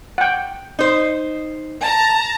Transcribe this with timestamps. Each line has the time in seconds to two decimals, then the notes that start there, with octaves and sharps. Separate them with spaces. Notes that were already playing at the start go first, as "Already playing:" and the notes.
0.18 F#5 G5
0.79 D#4 C5
1.82 A5 A#5